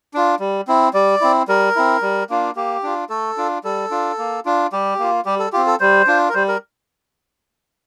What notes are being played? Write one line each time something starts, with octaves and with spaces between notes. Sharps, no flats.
D4 F4
G3
C4 E4
G3 D5
C4 E4
G3 A#4
C4 E4
G3
A#3 D4 F4
A#3 G4
D4 F4
A3 A4
D4 F4
G3 A4
D4 F4
A#3
D4 F4
G3 G4
A#3 F4
G3 G4
A4
C4 F4 G4
A4
G3 C5
D4 F4
A#4
G3 C5
A#4